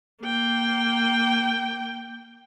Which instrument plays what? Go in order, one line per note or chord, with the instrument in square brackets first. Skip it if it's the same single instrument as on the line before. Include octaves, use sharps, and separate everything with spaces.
[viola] A#3 G5